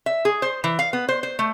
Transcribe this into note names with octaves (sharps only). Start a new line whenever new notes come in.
E5
G#4
C5
E3
F5
B3
C5
C5
A3